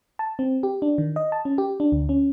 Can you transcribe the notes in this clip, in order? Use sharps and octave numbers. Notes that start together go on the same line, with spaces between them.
A5
C4
G4
D4
D#3
D#5
A5
C#4
G4
D4
D2
C#4